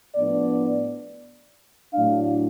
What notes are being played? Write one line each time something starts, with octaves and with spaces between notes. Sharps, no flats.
A2 F3 B3 D4 D5
A2 F#3 A3 D4 F5